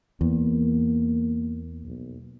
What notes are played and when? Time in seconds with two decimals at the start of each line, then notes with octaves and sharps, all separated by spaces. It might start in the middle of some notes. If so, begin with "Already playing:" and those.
0.21 E2 A#3
1.85 B1